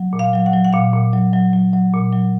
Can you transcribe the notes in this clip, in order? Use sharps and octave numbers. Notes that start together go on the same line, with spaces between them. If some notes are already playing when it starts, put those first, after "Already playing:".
Already playing: F#3
A#2
F5
F#3 F5
F#5
F#3
F#5
A#2 F5
A#2
F#3
F#3
F#3
F#3
A#2
F#3